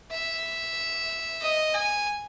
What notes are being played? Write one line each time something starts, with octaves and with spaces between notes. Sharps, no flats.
E5
D#5
G#5